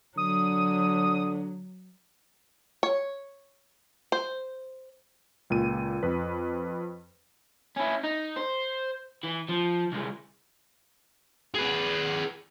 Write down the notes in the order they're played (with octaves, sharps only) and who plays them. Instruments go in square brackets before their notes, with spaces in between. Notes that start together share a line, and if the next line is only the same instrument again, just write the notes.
[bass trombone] D3 [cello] F#3 [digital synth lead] D#6
[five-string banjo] C#5
C5
[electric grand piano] C#2 A#2 D#7
F2 B4
[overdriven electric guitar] C#4 E4
D#4
C5
E3
F3
C2 G#3
[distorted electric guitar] G#4 B4